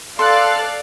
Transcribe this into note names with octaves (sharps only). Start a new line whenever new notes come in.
A4 D5 F5 C6 F#6 A6